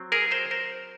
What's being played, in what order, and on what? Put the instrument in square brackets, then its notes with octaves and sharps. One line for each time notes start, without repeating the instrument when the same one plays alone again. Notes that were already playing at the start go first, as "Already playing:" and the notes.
Already playing: [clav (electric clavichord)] F#3 C4
G#4 A#4
A#4 C5
A#4 C5